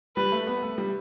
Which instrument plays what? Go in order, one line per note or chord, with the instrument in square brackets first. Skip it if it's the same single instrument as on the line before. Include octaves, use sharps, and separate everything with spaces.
[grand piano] G3 [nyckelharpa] B4
[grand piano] A3
B3
A3
G3